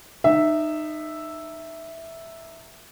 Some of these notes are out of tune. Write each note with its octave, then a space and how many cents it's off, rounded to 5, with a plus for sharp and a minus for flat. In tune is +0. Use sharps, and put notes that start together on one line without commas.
D#4 -25 E5 +0